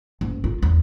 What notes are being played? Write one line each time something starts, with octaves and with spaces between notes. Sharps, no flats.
F#1
F4
E2